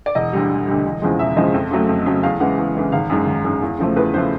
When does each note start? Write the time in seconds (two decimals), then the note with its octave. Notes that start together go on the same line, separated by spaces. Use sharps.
0.06 D5
0.15 E1 D#5
0.33 D2 D3 G3
0.50 E1
0.67 D2 D3 G3
0.85 E1
1.02 E2 C#3 F3 G#3
1.19 E1 E5
1.36 E2 C#3 F3 G#3 D#5
1.54 F2
1.71 C#3 F#3 A3
1.89 F2
2.06 C#3 F#3 A3
2.23 E2 F5
2.40 C#3 E3 G#3 F#5
2.58 E2
2.75 C#3 E3 G#3
2.92 G#1 F5
3.10 F#2 D#3 G#3
3.27 G#1
3.44 F#2 D#3 G#3
3.62 E2
3.79 C#3 F3 A3
3.96 E2 B4
4.14 C#3 F3 A3 C5